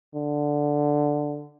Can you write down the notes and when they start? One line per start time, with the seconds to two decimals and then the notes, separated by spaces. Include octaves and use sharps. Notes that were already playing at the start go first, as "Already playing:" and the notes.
0.15 D3